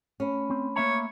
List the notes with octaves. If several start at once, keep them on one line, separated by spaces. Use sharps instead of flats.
A3 C#4 B5
C4
A#3 C#5 E5 A#5